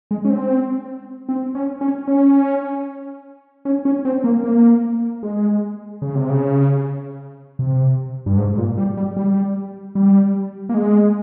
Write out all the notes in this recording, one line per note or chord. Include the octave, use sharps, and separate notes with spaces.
G#3
C#4
C4
C4
C#4
C#4
C#4
C#4
C#4
C4
A#3
A#3
G#3
C#3
C3
C#3
C3
G2
G#2
A#2
G3
G3
G3
G3
A#3
G#3